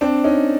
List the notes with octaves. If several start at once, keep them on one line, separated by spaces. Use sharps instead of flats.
C4 D4
C#4 D#4